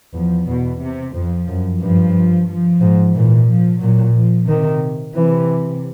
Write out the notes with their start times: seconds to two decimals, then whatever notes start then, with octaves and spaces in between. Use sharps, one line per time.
0.14 E2 F3
0.47 E2 B2
0.81 C3
1.14 F2 F3
1.48 F#2
1.81 G2 F3
2.48 F3
2.81 G#2
3.14 A#2 E3
3.48 F3
3.81 A#2 F#3
4.15 F3
4.48 C3 D#3
5.15 C3 E3